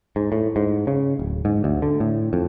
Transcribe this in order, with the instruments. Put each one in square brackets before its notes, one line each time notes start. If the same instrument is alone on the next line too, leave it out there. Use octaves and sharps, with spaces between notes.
[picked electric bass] G#2
A2
G#2
C#3
D1
G#2
D2
D3
A2
F2